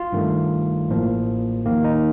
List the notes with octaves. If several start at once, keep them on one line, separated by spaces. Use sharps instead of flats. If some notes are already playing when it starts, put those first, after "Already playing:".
Already playing: F4
G2 D#3 A3
A1 A2 F3 A#3
D#2 D#3 A#3
D#4